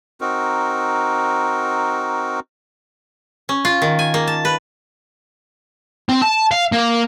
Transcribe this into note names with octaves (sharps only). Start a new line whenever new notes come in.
C4 D#4 F#4 A#4
C#4
F4
D#3
G#5
A#3
A5
B4
C4
A5
F5
A#3